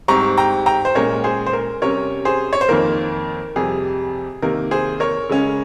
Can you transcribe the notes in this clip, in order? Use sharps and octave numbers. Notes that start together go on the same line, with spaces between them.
G#2 G3 C4 A#5 C#6
G5 A#5
G5 A#5
C5
A#2 G#3 C#4 A#4 C#5
G#4 C5
C5
A#4
C3 G3 C#4 A#4 C#5
G#4 C5
C#5
C5
F2 D#3 A#3 A#4
F2 C3 G3 G#4
C3 D#3 A#3 A#4
G#4 C5
A#4 C#5
C#3 G#3 C#4